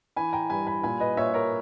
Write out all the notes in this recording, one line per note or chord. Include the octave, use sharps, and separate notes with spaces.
E3 G#5 B5
G5 A#5
G2 G#5 B5
G#5 B5
A#2 G#5 B5
B4 D#5
A#2 C#5 E5
A#4 C#5